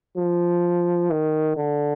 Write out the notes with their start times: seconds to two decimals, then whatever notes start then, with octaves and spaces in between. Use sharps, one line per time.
0.17 F3
1.11 D#3
1.57 D3